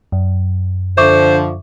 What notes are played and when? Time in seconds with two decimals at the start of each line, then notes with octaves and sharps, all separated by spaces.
0.12 F#2
0.98 D3 F3 C5 E5 C#6 D6